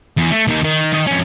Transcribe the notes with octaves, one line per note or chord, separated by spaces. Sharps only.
E2
A3
D#2 D#3
D#3
D#3 D#5
F2 C#4